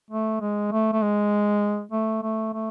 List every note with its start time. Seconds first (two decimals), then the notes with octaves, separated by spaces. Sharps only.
0.11 A3
0.41 G#3
0.72 A3
0.93 A3
1.02 G#3
1.92 A3
2.22 A3
2.54 A3